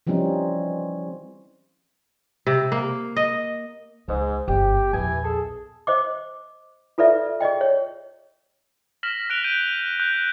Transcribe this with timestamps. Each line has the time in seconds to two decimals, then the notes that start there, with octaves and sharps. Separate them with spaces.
0.07 E3 F3 G3 C4 C#4 D#4
2.47 C3
2.72 A#3
3.16 D#5
4.08 C#2 G#2
4.48 G1 G4
4.93 A#1 E2 E3 G#5
5.24 G#4 A4
5.87 C5 D#5 D6
6.98 F4 A4 B4 D5 E5
7.40 G#4 D5 D#5 G5
7.61 C#5
9.03 F6 A#6 B6 E7 F#7
9.30 F#6 B6 D7 F7 G7
9.44 G6 D7 D#7
10.00 F#6 G6